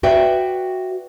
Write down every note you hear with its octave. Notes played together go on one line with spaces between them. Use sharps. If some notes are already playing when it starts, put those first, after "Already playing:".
F#4 B4 D5 E5 G5